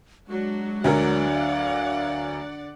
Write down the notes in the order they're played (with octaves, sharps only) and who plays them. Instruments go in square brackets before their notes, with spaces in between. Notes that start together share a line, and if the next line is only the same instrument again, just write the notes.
[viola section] F#3 D4 F#4 [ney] G#3
[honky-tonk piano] D2 F#3 A#4 [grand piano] D3 [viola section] D5 F#5
[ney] F5